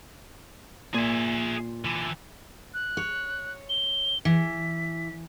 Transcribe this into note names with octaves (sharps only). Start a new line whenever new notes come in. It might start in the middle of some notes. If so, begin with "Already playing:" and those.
A#2 G#4 E5
D3 E3
F#6
C#5
G7
E3 B6